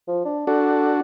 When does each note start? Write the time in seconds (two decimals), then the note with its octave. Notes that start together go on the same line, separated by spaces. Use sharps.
0.08 F3
0.25 D4
0.47 D4 F#4 A4